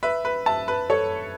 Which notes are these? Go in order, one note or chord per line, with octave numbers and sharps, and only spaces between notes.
B4 E5
B4
E5 A5
B4
A4 C#5